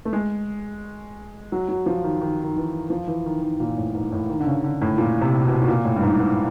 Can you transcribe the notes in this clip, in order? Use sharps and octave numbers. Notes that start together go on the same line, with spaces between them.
A3
G#3
F#3
F#3
F3
D#3
D#3
D#3
E3
F3
E3
D#3
D#3
A#2
A2
G#2
A2
D#3
D3
C#3
D3
A2
A#2
C3
B2
B2
A#2
A2
G2
G#2
G#2